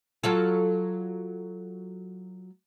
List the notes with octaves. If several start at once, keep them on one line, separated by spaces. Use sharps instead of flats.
F#3 F4 A4